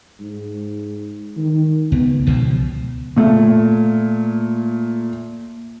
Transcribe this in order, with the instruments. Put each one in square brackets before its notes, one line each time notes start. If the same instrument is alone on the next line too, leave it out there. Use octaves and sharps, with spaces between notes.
[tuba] G#2
D#3
[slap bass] C#2 [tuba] B3
[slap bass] C#2 B2 F3
[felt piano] A#2 A3